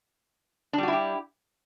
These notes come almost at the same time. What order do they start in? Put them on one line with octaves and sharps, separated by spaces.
D4 G3 F#4 E4 G4